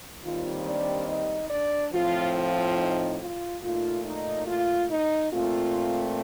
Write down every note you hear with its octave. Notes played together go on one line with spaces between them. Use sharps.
D#2 D#3 G3 C4 F4
D4 D5
D#4 D#5
D4 D5
A2 F3 C4 F4
F4
D#4
F4
A#2 A3 D#4 F4
D#4
F4
D#4
A#2 A3 C4 F4